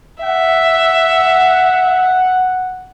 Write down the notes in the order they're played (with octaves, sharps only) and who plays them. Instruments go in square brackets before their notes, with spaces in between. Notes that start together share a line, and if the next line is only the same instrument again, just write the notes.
[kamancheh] E5 [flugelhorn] F#5